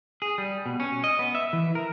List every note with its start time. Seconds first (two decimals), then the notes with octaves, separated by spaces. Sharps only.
0.22 G#4
0.38 G3
0.66 B2
0.80 C#4
1.04 D#5
1.19 B3
1.35 E5
1.53 E3
1.75 A#4